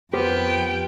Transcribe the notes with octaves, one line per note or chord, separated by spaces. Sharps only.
F2 B3 G4 A#4 C5 G5